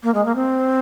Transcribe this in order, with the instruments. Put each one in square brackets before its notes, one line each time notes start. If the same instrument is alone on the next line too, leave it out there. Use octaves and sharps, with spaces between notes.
[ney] A#3
G#3
A#3
C4